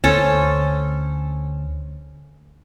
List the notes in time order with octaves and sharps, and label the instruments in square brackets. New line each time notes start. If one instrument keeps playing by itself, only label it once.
[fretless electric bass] D2 [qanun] C#4 A4 C5